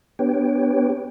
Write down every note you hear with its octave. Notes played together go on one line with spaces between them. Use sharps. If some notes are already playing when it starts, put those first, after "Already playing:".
B3 D4 G4 B4 C#5 G5